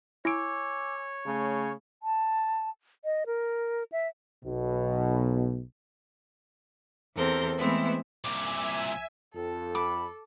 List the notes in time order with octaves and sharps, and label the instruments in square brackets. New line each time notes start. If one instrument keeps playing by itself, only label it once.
[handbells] E4 D7 [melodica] C#5 [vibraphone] G#5 D6 E6
[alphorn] C#3 [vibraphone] A3
[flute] A5
D#5
A#4
E5
[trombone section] B1 B2
[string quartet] E2 C4 A4 A#4 G6
E3 G#3 A3 B3 C4 E4
[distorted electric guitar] C2 A#2 [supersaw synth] E5 G#5 [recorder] D6
[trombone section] F2 [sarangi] A4
[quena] B5 [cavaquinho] D6